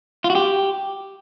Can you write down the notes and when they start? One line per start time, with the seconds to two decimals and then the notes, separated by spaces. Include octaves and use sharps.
0.24 F4
0.30 F#4
0.35 G4